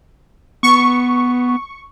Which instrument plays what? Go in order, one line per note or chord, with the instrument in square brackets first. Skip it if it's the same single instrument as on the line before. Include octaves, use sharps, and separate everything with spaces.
[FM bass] B3 [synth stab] C#6